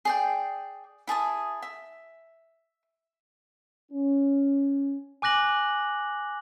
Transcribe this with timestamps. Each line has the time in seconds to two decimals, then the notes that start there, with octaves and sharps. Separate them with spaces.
0.05 G#4 D5 G5
1.07 E4 G#4 A5 D#6
1.62 E5
3.91 C#4
5.22 G#5 D6 F#6 A#6 F#7